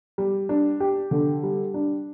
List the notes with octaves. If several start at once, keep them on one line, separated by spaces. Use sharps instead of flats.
G3
D4
G4
D3
G3
D4